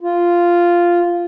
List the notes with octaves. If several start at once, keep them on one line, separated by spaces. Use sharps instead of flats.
F4